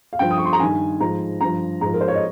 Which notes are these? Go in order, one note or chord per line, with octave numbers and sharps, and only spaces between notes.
F5
G2 F3 G5
D#6
C#6
C6
A#5
G2 D#3 G#5
G#2 F3 A#5
G2 F3 A#5
G#2 F3 A#5
A#4
C5
C#5
D#5